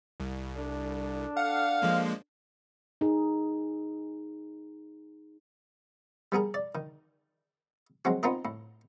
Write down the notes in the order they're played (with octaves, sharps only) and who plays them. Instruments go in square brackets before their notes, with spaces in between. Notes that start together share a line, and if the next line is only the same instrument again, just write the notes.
[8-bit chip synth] C2
[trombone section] D4 A4
[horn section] F5 [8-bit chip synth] F#5
[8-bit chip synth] F3 G#3 A#3
[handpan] D#4 G#4
[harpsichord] G3 B3 G#4 A#4
D5
D#3
F#3 G#3 C4 F#4
B3 C4 D#4 F4 A#4 D#5
A2